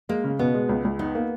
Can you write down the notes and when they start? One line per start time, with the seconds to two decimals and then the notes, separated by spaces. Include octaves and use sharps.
0.09 G#3 A#3
0.24 C#3
0.39 B2 B3
0.54 G#3
0.69 C#2
0.85 C#2
0.99 B3 D#4
1.15 A#3